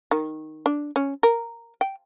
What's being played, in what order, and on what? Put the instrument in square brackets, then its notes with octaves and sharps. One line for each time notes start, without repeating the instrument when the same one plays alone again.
[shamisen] D#3
D4
C#4
A#4
G5